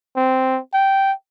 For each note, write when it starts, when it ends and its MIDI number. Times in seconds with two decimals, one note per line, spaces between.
0.16 0.60 60
0.73 1.12 79